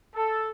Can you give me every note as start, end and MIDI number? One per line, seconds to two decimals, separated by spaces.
0.15 0.51 69